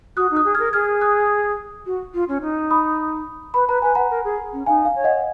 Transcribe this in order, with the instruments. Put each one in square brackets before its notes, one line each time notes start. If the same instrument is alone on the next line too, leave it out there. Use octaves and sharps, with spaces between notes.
[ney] F#4 [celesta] D#6 F#6
[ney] D#4
[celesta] D#6 F#6
[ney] G#4
[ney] A#4 [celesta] F6 G#6
[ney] G#4 [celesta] F6 G#6
[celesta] D#6 F#6
[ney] F#4
F4
C#4
D#4
[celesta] B5 D#6
[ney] B4 [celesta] B5
[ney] B4 [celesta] A#5
[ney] B4 [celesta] G#5
[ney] B4 [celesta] F#5 A#5
[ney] A#4
G#4
C#4
[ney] D#4 [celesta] F5 G#5
[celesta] F5
[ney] C#5
[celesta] D#5 F#5